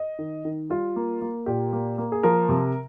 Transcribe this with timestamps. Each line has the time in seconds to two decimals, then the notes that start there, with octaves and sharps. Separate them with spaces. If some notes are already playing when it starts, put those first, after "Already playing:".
Already playing: D#5
0.19 D#3
0.45 D#3
0.69 G3 F4
0.96 A#3
1.21 A#3
1.46 A#2 G4
1.73 A#3
1.98 A#3
2.12 G#4
2.23 F3 A#4
2.49 C3